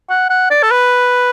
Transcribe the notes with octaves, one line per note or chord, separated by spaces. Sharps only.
F#5
F#5
D5
A4
B4